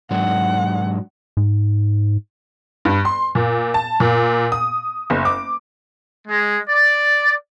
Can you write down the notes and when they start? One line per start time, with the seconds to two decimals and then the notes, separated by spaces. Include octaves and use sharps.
0.11 G#2 F#3 D4 F#5
1.37 G#2
2.85 G2
3.05 C6
3.35 A#2
3.74 A5
4.00 A#2
4.52 D#6
5.10 F#1
5.25 D6
6.27 G#3
6.67 D5